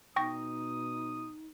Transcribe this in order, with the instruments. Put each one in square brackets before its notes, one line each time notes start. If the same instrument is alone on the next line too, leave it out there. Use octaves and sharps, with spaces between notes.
[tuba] B2 [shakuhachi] D#4 [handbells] G5 C#6 A#6 [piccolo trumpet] D#6